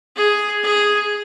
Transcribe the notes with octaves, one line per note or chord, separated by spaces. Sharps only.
G#4
G#4